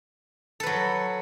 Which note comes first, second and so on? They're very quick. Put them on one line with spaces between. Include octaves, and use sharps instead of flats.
A4 B4 F#3